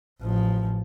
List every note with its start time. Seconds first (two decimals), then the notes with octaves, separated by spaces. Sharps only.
0.21 A1 F3